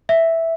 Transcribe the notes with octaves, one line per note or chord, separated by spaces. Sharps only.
E5